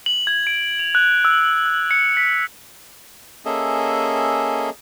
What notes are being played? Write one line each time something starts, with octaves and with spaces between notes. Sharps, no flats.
F#7
G#6
D7
F7
F#6
E6
F#6
C#7
B6
A#3 C#4 G#4 A4 D#5 E5